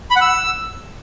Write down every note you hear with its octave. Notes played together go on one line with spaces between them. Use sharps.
B5
F#5
E6